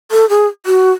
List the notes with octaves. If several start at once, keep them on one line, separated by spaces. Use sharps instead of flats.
A4
G#4
F#4